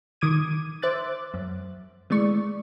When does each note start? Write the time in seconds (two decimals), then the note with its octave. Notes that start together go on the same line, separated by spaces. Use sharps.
0.21 D#3 D6 D#6 G#6 D#7
0.82 C5 E5 D6 F#6 A6
1.34 F#2
2.10 E3 G#3 A3 D5 C#6